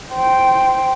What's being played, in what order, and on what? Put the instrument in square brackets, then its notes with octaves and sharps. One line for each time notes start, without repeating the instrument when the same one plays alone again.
[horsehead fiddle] C5 G5